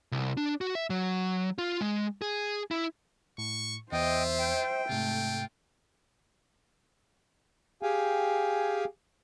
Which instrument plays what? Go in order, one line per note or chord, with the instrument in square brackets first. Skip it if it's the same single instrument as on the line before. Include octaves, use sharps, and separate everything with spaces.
[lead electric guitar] C2
D4
F#4
E5
F#3
F4
G#3
G#4
E4
[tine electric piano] A2 [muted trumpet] C#6
[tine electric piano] E2 [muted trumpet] F4 [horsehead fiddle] C5 E5 [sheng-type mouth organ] D#5 G5
[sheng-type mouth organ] G5
[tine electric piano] G#2 C3 [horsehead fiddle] A3 [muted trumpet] F4
[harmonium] G4 G#4 F5 G5 G#5